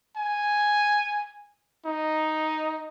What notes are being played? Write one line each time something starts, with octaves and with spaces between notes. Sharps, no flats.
G#5
D#4